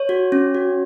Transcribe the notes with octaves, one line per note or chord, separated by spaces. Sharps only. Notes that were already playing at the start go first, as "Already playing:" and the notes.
Already playing: C#5
F#4
C#4
F#4